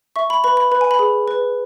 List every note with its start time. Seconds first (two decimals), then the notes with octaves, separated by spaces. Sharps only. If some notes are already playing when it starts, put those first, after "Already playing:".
0.16 E5 C#6
0.30 B5
0.44 B4 B5
0.57 B5
0.71 B4 B5
0.81 G#5
0.91 B5
0.99 G#4
1.28 B4